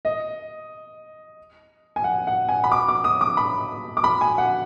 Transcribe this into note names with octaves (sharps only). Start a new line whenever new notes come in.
D#5
G#5
F#5
F#5
G#5
B5
D6
D6
D#6
D6
B5
D6
B5
G#5
F#5